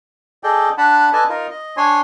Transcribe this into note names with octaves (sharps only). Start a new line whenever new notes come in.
G#4 A4 D5 D#5 G5
D4 F#5 A5 B5
A4 B4 D5 D#5 G#5 A5
D#4 F4 A#4
D#5
D4 C#5 G#5 C6